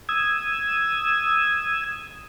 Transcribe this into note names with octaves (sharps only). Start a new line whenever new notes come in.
D#6 E6 G#6